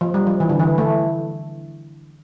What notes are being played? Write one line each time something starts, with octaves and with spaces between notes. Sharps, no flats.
F3
G3
F3
E3
D3
E3
A3